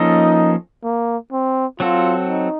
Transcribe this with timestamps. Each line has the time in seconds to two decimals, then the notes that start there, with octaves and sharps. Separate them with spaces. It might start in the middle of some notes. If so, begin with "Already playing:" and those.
Already playing: F3 A#3 C#4 D#4 A4 D#5
0.84 A#3
1.32 C4
1.80 F#3 C4 F4 F#4 A4
2.29 D#4